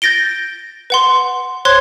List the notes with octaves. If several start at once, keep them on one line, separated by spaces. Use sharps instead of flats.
G6 A6 A#6 D7 G7
B4 F#5 C6
C5 C#5 C6 F#6 G#6